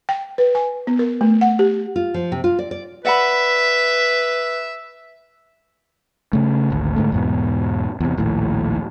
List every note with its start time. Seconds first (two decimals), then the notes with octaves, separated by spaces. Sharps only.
0.09 G5
0.38 B4
0.55 G#5
0.87 B3
0.99 A#4
1.21 A3
1.41 F#5
1.59 G4
1.96 F4
2.14 F3
2.32 C3
2.44 F4
2.59 D5
2.71 D5
3.05 B4 D5 E5 F#5 B5
6.33 C#3 A3
6.70 G#1 D2
6.96 G#2 D3 A3
7.12 E2 G#2 B2
8.00 E2 C3
8.18 A#1 D#2 A2